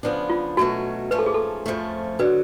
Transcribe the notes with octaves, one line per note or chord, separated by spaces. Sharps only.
C#3 F3 B3 D4
F4
B2 F#3 A3 C#4 F#4
G#2 F3 A3 C#4 B4
A4
G#4
A4
F2 F3 A3 C#4
D3 F#3 B4